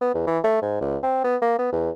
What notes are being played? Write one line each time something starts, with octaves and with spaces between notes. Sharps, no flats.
B3
E2
E3
A3
G#2
C#2
C4
B3
A#3
B3
E2